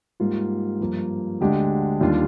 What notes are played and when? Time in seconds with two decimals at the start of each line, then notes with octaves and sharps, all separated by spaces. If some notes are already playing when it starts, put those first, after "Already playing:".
0.20 G#2 G3 A#3 F4
0.80 G2 F3 A#3
1.41 D2 D3 G#3 D4 G4
2.01 D#2 D#3 G3 D4 F4